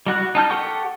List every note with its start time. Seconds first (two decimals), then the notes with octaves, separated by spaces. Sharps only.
0.06 G3 F#4 F#6
0.35 D#4 A5 F6 G6
0.50 G4 A4 F#5 G5 C#6